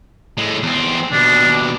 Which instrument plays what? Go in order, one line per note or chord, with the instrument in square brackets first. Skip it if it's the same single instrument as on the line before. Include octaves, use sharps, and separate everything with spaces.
[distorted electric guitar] A2 G#3
E2 C4
[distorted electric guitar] D#2 B2 [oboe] D4